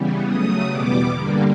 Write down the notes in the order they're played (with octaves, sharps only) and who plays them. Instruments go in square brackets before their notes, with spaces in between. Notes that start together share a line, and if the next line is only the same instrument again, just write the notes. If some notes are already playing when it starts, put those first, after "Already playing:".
Already playing: [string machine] C#3 E3 G3 B3
C#3 F#3 A3 D#6
E2 B2 G3 B3 D6
G2 D3 G3 A#3